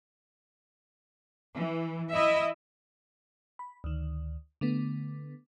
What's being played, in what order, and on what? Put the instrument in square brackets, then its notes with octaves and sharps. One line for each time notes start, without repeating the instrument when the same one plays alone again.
[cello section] E3
E4 D#5 E5
[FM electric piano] B5
D2 D#3
D3 A3 B3